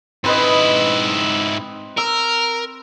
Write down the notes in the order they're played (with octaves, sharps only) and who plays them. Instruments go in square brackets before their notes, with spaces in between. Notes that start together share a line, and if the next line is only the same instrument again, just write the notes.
[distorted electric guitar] G#2 E4 [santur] C4 B4 D#5
[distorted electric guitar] A#4 [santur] E6